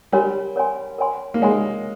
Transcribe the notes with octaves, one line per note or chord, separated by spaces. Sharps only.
G3 A#4 C#5 G#5 C6
A#4 C#5 G#5 C6
A#4 C#5 G#5 C6
A#3
G#3 A#4 C#5 G#5 C6